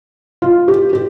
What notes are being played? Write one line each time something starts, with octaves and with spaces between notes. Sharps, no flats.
F4
G4
G4